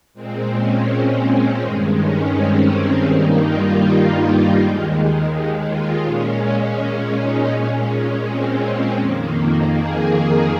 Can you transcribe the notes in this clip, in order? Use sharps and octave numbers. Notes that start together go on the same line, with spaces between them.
A#2 G#3 C4
C#4
C4
G2 D#3 G#3
C#4
C4
C#4
G2 D#3 G3 A#3 D#4
F4
F4
D#2 D#3 G#3
F4
A#2 G#3 C#4
D#4
A#2 G#3 C#4
C4
F2 D#3 A#3
G#4